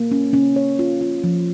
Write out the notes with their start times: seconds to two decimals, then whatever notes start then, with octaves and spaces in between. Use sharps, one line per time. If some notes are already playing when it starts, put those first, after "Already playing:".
Already playing: A#3
0.12 C#4
0.33 C#4
0.56 C#5
0.79 F4
1.01 F4
1.24 F3